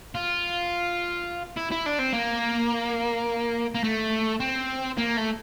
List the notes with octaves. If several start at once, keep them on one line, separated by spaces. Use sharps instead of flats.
F4
E4
E4
D4
C4
A#3
A#3
A3
C4
A#3
A3